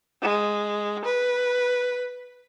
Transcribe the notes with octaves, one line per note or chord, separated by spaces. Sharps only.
G#3
B4